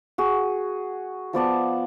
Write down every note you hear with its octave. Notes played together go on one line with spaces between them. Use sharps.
F#4 G#4
F3 B3 D5 A5